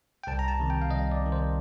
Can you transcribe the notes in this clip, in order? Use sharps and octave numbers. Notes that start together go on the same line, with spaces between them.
G5
C2 A5
A#5
A5
C3 D#3
G5
F5
C2 D#5
D5
C3 D#3
C5